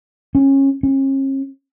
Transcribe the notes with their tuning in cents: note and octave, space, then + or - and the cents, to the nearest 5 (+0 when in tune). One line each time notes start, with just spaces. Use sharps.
C#4 -20
C#4 -45